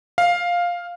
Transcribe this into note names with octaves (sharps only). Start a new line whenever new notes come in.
F5